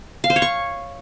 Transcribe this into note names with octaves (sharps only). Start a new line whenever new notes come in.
F5
C5
C#5
C#6